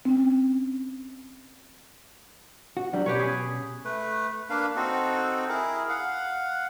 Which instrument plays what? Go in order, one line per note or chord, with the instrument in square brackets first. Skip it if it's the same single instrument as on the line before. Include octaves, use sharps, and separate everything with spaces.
[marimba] C4 C#4
[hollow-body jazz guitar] F#4
F#3 G3 D4
[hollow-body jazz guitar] B2 C#4 [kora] G4 B4 C#5
[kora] G#4
[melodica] A3 B4
A#3 D4 B4 F5
C4 D#4 F#4 A4
E4 G#4 A#4
F5 F#5